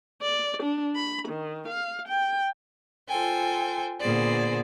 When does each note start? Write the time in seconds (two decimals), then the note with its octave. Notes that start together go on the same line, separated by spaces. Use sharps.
0.22 D5
0.63 D4
0.95 B5
1.28 D#3
1.68 F5
2.08 G5
3.08 F4 A4 C5 G5 G#5
4.00 A#2 D3 B3 G#4 C5 D5